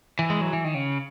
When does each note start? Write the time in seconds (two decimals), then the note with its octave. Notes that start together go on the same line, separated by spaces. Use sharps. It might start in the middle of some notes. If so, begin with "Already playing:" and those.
0.19 E3
0.30 G#3
0.41 F#3
0.53 E3
0.64 D#3
0.74 C#3